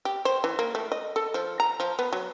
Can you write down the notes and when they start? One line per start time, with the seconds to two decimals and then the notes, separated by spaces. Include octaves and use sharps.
0.05 G4
0.25 C5
0.44 E3
0.59 A#3
0.75 A3
0.92 D#5
1.16 A4
1.34 F3
1.60 A#5
1.80 F3
1.99 B3
2.13 F#3